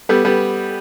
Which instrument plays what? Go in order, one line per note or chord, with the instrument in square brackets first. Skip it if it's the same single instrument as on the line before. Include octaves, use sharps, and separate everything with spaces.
[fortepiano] G3 B3 [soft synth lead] A4
[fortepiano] G3 B3